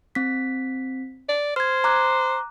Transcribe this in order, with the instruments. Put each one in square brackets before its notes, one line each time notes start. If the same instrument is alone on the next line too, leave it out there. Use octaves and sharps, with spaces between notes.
[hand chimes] C4 B6
[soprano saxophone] D5
[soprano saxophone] C5 [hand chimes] F6 G#6
[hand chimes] A#5 D6 F#6